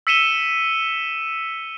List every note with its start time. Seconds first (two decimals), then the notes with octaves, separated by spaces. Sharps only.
0.07 E6 B6 C#7 D#7 E7 G7